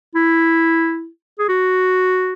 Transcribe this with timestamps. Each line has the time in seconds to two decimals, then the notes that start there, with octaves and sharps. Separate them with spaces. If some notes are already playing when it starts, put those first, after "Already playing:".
0.15 E4
1.39 G#4
1.49 F#4